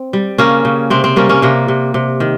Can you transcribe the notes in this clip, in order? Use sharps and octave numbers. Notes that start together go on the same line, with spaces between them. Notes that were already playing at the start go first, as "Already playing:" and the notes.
Already playing: C4
G3
C#3 A#3 C#4
C#3
C3 C4
C4
G3 A#3 C#4
A#3 C#4
C3 A#3
C3
C3
D#3